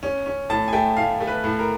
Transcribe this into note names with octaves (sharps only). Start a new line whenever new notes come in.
C#4
C#4
A2 A5
G#5
A3 G5
A2 F5
A3
B4
A2
A#4